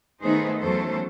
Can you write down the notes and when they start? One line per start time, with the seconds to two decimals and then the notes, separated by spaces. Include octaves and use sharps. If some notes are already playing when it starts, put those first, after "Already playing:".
0.22 D#3 A3 B3 D#4 G#4 C5
0.60 E2 F#3 A3 C#4 A4 C5